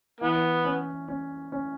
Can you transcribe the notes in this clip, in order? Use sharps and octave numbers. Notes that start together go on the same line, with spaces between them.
E3 B3
C#4
C#4
C#4